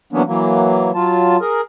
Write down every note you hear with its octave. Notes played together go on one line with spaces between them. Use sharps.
E3 F#3 A#3 B3 C#4 D4
E3 F#3 A#3
F#3 F4 A5
G#4 A#4